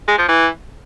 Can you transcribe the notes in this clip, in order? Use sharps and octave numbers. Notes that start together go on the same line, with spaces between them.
G#3
F3
E3